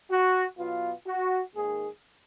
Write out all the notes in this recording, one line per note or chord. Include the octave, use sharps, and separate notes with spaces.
F#4
B2 F#3 B3 F4
F#4
G#2 D#3 A#3 G#4